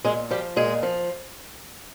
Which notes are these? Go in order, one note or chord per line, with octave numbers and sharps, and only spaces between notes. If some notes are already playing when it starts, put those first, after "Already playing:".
A#2 G#3 G#4
F3 G3 G4
A#2 G#3 G#4
F3